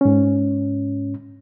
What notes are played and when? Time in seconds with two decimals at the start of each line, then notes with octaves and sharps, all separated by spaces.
0.01 G#2 C#4